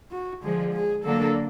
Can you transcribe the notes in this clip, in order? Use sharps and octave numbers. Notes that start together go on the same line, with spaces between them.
F#4
D3 F3 G#3 G#4
G#4
D3 F#3 A#3 D4 A4